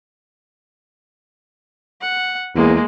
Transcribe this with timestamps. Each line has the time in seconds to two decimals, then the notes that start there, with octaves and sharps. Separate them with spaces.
2.01 F#5
2.55 E2 G#3 A#3